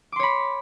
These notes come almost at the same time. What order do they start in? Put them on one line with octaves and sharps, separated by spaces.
D6 C6 C#5 B5